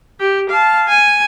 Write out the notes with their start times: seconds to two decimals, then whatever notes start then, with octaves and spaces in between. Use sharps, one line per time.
0.20 G4
0.50 F5 A5
0.88 G#5